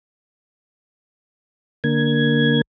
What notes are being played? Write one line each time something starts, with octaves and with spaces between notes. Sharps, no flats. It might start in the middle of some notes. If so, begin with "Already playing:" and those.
D3 A#3 G#6